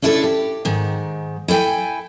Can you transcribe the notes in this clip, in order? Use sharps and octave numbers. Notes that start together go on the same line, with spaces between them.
C#4 D4 E4 F4 G#4 A4
G4
G#2 D#3
E4 A4 B4 G5 G#5